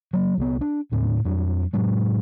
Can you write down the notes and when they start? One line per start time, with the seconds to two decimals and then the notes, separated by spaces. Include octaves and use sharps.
0.13 F#3 A#3
0.38 C2 F#3 B3
0.61 D4
0.92 D#2 A2 C4
1.25 F2 F#3 D4
1.73 A2 F#3 G#3